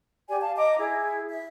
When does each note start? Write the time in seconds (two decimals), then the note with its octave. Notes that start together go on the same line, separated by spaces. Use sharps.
0.29 G4 D5 G#5
0.41 F5 A5
0.57 D#5 A#5 D6
0.79 E4 G#4
1.29 E5